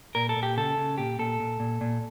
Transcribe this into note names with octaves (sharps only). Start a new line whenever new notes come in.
A#2 A#4
A4
A#2
G4
C#3 A4
C#3
A#2 G4
A#2 A4
A#2
A#2
A#2